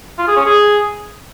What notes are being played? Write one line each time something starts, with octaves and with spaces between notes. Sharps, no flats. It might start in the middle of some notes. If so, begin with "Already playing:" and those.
F4
G#4
C#4
G#4